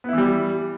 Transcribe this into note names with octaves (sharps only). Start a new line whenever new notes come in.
E3 G3 B3 E4